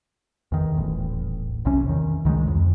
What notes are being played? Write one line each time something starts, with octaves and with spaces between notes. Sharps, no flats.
E2 D#3
D#1 A1
B1 C3 C#4
E2 D#3
C#2 D#3 E3 G#3
F2